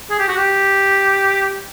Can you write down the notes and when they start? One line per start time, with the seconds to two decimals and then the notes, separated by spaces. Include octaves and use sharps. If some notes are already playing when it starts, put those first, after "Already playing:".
0.10 G#4
0.19 G4
0.28 F#4
0.37 G4